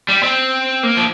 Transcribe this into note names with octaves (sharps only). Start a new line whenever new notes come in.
G3
C4
A#3
F3